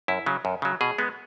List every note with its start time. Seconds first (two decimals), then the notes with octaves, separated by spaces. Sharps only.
0.08 F#2 E4
0.26 C#3 F#3
0.45 F#2
0.62 C#3 F#3
0.81 B2 G#4
0.98 G#3 B3